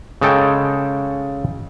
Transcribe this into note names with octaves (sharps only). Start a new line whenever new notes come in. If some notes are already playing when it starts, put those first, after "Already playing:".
C#3 G#3 A4 G5